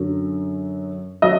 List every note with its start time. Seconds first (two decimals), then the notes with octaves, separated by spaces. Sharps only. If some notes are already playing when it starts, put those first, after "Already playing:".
Already playing: F#2 D3 F#3
1.22 F#3 D#5